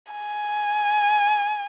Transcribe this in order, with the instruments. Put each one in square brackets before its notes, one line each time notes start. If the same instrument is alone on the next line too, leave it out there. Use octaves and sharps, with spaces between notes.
[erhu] G#5